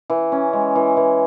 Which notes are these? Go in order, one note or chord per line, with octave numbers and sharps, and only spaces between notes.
E3
C#4
G#3
E3
E3